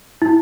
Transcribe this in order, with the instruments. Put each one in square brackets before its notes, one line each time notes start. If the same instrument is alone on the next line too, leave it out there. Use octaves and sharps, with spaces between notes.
[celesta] E4